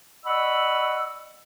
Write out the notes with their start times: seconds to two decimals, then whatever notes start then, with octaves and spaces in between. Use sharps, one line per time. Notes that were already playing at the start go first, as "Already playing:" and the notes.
0.25 D5 D#5 F#5 B5 C#6 E6